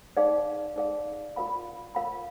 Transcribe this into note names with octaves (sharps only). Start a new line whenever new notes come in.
D#4 G#4 D5 F5
D#4 G#4 D5 F5
F4 A#4 F5 B5
F4 A#4 F5 B5